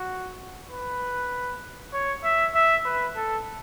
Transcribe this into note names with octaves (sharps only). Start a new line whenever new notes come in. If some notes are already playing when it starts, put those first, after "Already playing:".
Already playing: F#4
B4
C#5
E5
E5
B4
A4